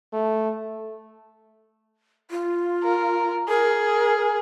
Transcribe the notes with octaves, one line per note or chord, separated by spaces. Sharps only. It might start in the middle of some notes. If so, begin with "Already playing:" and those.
A3
F4
A#4
G#4 A#4